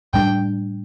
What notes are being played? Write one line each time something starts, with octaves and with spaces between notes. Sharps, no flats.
A2 G3 D4 G5